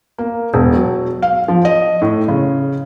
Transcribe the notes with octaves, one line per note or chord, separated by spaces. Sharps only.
A#3
E1
F#3
F5
F3
D#5
A2
C#3